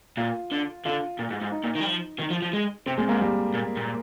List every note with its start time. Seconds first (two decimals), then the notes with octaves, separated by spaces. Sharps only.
0.17 A#2 F4
0.51 D3
0.85 D3 F4
1.19 A#2
1.30 G#2
1.41 G#2
1.52 D#4
1.64 A#2
1.75 D#3
1.81 G3
1.86 F3
2.20 D#3
2.31 F3
2.42 F3
2.53 G#3
2.86 C3 C4
2.98 A#2 G#3
3.09 G#2 A#3
3.21 G3
3.54 A#2
3.77 A#2